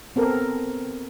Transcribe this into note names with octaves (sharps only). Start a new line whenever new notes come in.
B3 C4 A4 A#4